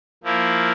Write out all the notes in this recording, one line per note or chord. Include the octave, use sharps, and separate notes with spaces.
F3 A#3 E4